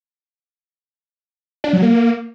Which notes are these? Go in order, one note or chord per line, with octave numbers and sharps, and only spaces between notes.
D4
F#3
A#3